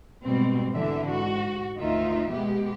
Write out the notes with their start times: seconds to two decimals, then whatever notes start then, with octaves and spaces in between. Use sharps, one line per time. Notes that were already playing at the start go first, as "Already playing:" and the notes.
0.23 G#2 B2 G3 C4
0.74 D3 E3 E5
1.06 G#2 F#4
1.78 D2 D#3 D#4 F4 E5
2.31 B2 G#3 B3 G4